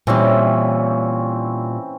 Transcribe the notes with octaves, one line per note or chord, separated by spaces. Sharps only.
A#2 E3 G3 C4 C#4